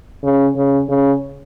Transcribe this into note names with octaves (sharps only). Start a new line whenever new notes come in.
C#3
C#3
C#3